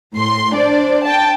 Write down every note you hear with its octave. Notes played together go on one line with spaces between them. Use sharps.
A2 C6
D4 C5 D5
G5 A5